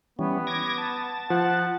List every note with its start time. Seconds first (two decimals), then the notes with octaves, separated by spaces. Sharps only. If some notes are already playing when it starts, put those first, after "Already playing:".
0.19 E3 G3 B3 C#4
0.47 D6 G#6 A#6
0.78 A5
1.30 F3 F#5